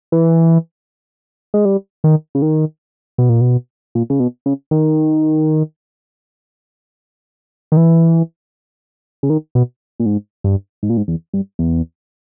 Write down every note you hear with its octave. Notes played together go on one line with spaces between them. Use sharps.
E3
G#3
G3
D#3
C#3
D#3
B2
A#2
B2
A#2
C#3
B2
C#3
D#3
D#3
E3
C#3
D#3
B2
A#2
G#2
G2
G#2
A#2
G#2
E2
G2
E2